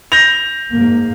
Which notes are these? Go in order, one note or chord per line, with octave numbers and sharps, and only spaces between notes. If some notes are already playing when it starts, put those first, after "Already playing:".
G6 A#6 F7
G#2 A#3